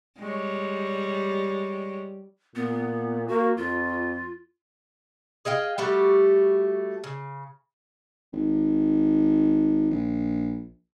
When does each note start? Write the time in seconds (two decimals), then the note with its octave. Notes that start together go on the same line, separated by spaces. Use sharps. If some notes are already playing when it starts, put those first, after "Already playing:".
0.20 G3 G#3 C#5
2.56 A#2 B3
3.28 A#3 F#4
3.57 F2 F4
5.45 G#4 D#5 F5 G5
5.78 G3 A3 F#4 G4
7.04 C#3
8.33 G#1
9.91 A#1